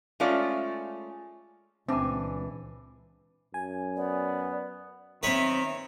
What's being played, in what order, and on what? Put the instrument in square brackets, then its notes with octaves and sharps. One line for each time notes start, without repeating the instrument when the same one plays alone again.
[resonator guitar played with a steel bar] G#3 A3 C#4 F4 D5
[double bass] C#2 A#2 [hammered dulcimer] E3 [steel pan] C4 [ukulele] D4 G#5
[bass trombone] F#2 [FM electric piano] G#5
[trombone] B3 [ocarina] D5
[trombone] D#3 [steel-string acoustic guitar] C4 E5 [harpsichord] B4 C#5 B5